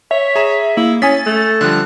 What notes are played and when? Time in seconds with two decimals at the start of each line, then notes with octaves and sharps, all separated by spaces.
0.11 C#5 E5
0.35 G#4 A#5 E7
0.77 A#3 E4
1.02 C#4 G#5 D#6 A6 B6
1.26 A3
1.61 D3 F3 G3 F#6